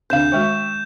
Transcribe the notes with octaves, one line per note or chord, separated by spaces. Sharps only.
D2 C3 D4 C5 F5 G6 E7
D#3 G#3 F#4 E5 G5 C#6